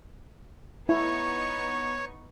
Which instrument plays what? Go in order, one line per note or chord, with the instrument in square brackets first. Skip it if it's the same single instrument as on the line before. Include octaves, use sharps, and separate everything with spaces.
[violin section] B3 D#4 C#6 [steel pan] E4 [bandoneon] C#5